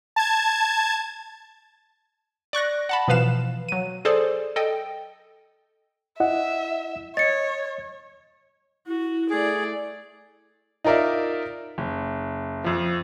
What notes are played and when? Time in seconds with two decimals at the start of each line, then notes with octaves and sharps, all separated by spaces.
0.16 A5 G#6
2.53 D5 C#6 F#6 A#6
2.89 F#5 A5 B5
3.08 B2 E3 F3 B4 F5 E7
3.69 F#3 D#7
4.05 G#4 A4 C5 D5
4.56 A4 D#5 G5
6.20 E4 D#5 E5 F#5
7.17 C#5 D#5 A6 C#7
8.87 E4 F#4
9.30 A3 G#4 D5
10.84 D#4 F4 A#4 D5 E5
11.78 F#1
12.64 F2 F3